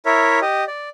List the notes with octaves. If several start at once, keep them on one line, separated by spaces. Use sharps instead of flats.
E4 A#4 C#5 E5
G4 D#5
D5